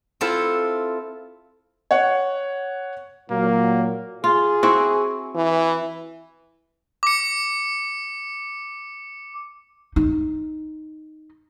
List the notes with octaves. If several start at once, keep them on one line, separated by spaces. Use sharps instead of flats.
C4 E4 F4 A4
C#5 F#5
A#2 F#3 A#3
F4 G#4
C4 E4 F#4
E3
D6 C#7
D#4